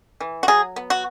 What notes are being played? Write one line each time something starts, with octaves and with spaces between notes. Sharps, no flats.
E3
F#4
F#3 G#4
B3
F#4